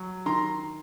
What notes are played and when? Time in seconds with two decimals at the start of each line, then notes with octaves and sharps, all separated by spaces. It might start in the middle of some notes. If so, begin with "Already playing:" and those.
Already playing: F#3
0.26 D#3 A#5 C6